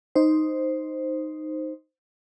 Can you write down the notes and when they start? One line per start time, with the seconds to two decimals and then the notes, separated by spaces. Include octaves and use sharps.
0.15 D#4 C5